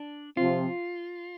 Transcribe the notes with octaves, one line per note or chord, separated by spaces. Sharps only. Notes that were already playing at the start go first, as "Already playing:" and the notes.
Already playing: D4
C3 F3 C4 F4